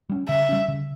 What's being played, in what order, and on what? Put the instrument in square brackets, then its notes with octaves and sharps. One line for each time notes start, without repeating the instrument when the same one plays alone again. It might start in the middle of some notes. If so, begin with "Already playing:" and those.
[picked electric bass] G3 C#4
[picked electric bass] C#3 [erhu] E5
[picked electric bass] G3 C#4
C#3